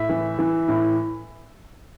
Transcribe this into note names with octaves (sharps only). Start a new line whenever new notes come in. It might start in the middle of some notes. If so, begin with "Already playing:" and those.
Already playing: A2 E5
E3
E3
A2